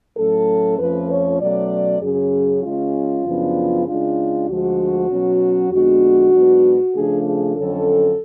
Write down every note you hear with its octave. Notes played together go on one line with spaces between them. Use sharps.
A2 F#3 A3 C#4 A4
F2 F3 A3 C#4 B4
C#5
B2 F#3 A3 C#4 D5
F#2 C#3 F#3 C#4 G#4
C#3 G#3 C#4 F4
F#2 C#3 F3 B3 D4
C#3 G#3 D4 F4
D2 D3 F3 G#3 F#4
B2 F#3 C#4
F2 D3 G#3 B3 D4 F#4
G#2 F#3 B3 D4
C#3 F3 A3 D4 G#4
G#4
F2 D3 F#3 C#4 A4